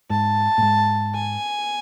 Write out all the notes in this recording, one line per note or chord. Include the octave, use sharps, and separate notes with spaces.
G#2 A5
A2
G#2
G#5